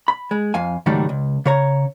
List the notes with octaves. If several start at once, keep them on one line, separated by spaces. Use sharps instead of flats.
B5
G#3
F2 F5 G#5
C#2 G#2 D#3 F#3 G3 A3
C#2
C#3 C#5 A#5